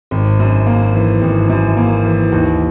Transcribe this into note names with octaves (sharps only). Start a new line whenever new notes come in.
G#1
F#2
A#3
E3
G#1
F#2
A#3
E3
D#2